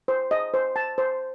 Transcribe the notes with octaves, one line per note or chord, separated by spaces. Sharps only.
C5
D#5
C5
A5
C5